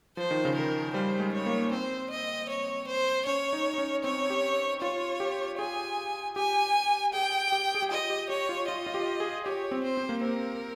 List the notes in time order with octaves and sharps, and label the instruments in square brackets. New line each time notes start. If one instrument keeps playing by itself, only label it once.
[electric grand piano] F3 [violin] C5
[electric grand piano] D#3
C#3
[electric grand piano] D#3 [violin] A#4
[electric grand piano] G3 [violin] C5
[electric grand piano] G#3
[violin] C#5
[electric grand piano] A#3
[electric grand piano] C4 [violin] C5
[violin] D#5
C#5
C5
[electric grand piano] C#4 [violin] C#5
[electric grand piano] D#4
D#4
C#4
[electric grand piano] C4 [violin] C#5
[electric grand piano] G4
[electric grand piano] F4 [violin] C#5
[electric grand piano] G4
[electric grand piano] G#4 [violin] G#5
[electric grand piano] G4 [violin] G#5
[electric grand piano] G#4 [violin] G5
[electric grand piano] G4
G#4
G4
[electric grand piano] F4 [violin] D#5
[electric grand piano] G4
[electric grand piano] G4 [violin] C#5
[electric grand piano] F4
[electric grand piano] F4 [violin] D#5
[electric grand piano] F4
G4
G#4
[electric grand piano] G4 [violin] C#5
[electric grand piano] C4
[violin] C5
[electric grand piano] C4
A#3
[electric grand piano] C4 [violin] A#4